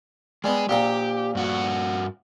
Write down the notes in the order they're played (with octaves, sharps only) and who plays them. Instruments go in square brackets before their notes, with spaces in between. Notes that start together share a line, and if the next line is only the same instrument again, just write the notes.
[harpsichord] G3 B3 [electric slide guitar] G#3 G#4
[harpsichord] A#1 A#2 A#5 [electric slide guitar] G4
[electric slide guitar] G2 F#4 F#5